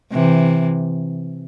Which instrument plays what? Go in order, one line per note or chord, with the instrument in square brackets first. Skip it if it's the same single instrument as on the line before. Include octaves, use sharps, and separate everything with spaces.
[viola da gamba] C3 E3